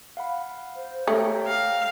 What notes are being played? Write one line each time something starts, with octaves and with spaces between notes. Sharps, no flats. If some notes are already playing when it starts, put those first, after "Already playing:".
F5 F#5 B5
C5
A3 G4 C#5 G5 A#5
F5 A#6